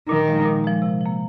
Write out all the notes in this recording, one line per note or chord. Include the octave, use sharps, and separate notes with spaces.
A#2 D#3
F3 G#3
A#2
F3 G#3
C3
F3 A#3